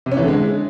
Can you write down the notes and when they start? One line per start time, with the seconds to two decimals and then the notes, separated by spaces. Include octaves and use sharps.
0.06 C3
0.12 C#4
0.17 E3
0.22 D3
0.28 G#3